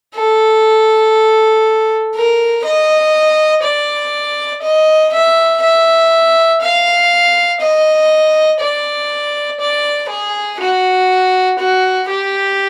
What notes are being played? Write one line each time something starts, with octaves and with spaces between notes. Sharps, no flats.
A4
A#4
D#5
D5
D#5
E5
E5
F5
D#5
D5
D5
G#4
F#4
F#4
G4